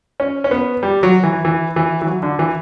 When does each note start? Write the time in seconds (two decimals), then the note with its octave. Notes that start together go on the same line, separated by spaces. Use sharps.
0.20 C#4
0.44 C#4
0.51 B3
0.83 G3
1.03 F#3
1.23 E3
1.45 E3
1.76 E3
2.02 E3
2.07 F#3
2.23 D3
2.39 E3